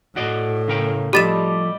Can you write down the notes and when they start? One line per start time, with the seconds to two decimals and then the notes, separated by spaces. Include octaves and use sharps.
0.16 A2 F#4 D5 D#5
0.68 C#3 A#4 G5
1.13 F3 G3 A3 G4 D5 D#5 A6 E7